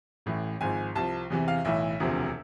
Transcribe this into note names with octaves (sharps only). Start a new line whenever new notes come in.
A1 A2 E3
G#1 G#2 F3 G#5
C2 C3 F3 A5
E2 C3 E3
F5
B1 A2 E3 E5
E1 D2 C3 F3